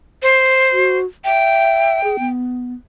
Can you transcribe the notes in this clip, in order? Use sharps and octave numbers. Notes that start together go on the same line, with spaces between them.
C5
F#4
E5 G5
G#4
B3